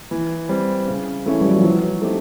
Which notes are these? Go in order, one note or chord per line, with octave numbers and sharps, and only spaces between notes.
E3
G3 C4
C#3
E3 A3 C#4 E4
G3
F#3
F3
E3 F#3
A3 C4 D#4 G4